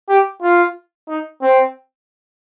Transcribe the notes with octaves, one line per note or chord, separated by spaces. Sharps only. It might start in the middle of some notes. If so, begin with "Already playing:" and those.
G4
F4
D#4
C4